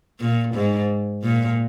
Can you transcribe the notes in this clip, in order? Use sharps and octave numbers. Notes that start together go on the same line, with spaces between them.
A#2
G#2
A#2